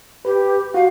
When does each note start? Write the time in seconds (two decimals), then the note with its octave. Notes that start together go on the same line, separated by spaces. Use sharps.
0.25 G4 B4
0.74 F#4 F5